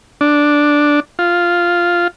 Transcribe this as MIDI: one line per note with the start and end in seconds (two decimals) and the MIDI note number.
0.21 1.00 62
1.19 2.08 65